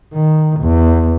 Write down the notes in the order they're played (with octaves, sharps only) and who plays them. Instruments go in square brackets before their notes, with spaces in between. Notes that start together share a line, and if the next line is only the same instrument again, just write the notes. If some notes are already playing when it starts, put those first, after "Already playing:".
[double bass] D#3
E2